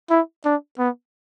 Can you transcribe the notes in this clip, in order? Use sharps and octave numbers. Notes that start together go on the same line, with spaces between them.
E4
D4
B3